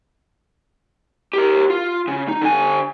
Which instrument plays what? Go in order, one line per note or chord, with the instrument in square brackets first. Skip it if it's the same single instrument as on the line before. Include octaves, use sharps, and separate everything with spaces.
[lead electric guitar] G4 A#4
F4
C#3
D#4
D3 G#5